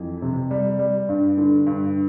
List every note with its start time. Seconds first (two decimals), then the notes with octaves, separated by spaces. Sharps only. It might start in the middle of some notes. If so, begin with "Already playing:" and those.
Already playing: F2 E3
0.22 C3
0.51 G3
0.79 G3
1.09 G2
1.37 D3
1.66 G2